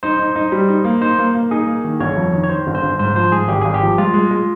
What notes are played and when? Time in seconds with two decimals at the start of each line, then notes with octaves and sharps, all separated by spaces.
0.03 D#4 C5
0.19 D#4
0.36 D#4
0.52 G3
0.69 D#4
0.84 A#3
1.01 D#4 C5
1.19 A#3
1.35 A#3
1.51 D#4 G#4
1.67 A#3
1.84 D#3
2.00 G1 C#5
2.16 F2
2.33 D#3
2.43 C#5
2.49 D#3 C5
2.67 G1
2.75 C5
2.83 G1
2.99 G#2 C5
3.16 F3 C5
3.32 G#2 G#4
3.48 G#1 G4
3.61 G#1 G#4
3.74 G4
3.82 F3
3.98 G#3 F4
4.14 G#3
4.31 G#3